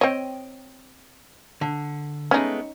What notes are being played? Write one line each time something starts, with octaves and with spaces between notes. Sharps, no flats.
C4 C#5 D#5 G5
D3
G#3 A3 B3 C#4 D#4